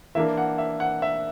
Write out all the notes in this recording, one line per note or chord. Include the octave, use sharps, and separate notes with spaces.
E3 A#3 D4 E5
F#5
E5
F#5
E5